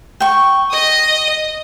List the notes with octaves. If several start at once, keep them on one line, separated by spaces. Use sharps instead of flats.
G5 C#6
D#5 D#6